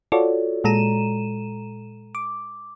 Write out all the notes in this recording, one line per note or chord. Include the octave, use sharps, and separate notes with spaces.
F4 F#4 A4 C#5 D5
A#2 G#3 A4 A#5 D#7 E7
D6